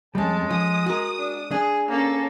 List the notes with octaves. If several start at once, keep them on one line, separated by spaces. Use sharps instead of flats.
F2 G3 G#3 C#4 A4 A5
F3 D#6
F#4 A#4
D4
D4 G#4
A#3 C#4 A4